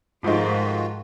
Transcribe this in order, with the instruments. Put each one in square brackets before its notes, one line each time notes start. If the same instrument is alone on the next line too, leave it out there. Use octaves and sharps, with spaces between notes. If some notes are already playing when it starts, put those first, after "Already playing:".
[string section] G#2 [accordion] D#3 F4 F#4 [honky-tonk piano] F3 A3 D#4